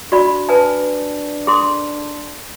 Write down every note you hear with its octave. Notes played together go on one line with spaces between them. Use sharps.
D4 F#4 D5 B5
B4 G#5 A5
G#4 A4 C6